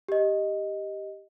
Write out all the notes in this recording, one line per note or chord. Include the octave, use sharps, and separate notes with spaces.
G4 D#5